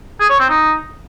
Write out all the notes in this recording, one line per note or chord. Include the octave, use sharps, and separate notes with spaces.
G#4
C#5
C4
D#4